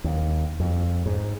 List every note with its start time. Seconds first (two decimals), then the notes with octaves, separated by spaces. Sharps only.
0.04 D#2
0.60 F2
1.06 G#2